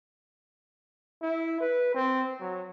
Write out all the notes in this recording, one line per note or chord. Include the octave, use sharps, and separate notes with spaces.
E4
B4
C4
F#3